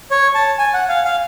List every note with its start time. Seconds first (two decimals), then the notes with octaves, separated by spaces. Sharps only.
0.11 C#5
0.35 A5
0.58 G#5
0.74 F#5
0.89 F5
1.05 F5